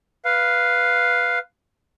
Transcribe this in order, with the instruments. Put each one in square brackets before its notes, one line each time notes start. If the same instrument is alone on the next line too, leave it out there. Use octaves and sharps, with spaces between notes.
[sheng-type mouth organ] B4 F5